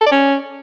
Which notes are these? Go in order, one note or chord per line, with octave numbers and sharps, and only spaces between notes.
A4
D5
C#4